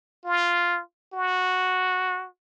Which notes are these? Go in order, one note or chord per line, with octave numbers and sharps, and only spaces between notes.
F4
F#4